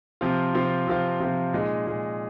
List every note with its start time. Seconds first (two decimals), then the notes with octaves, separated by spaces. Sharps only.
0.21 C3 F3 C4 F4
0.54 C3 F3 C4 F4
0.87 C3 F3 C4 F4
1.20 C3 F3 C4 F4
1.53 A#2 G#3 D#4 G#4
1.87 A#2 G#3 D#4 G#4